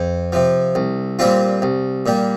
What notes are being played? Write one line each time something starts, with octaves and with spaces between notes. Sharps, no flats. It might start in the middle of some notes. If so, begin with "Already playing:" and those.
Already playing: F2
C3 F3
C2
A#2 G3 C4 F4
C2
A#2 G3